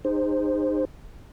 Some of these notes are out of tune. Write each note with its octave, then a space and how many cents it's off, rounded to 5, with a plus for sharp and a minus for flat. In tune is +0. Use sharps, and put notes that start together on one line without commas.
D#4 -30 G#4 -35 C5 +0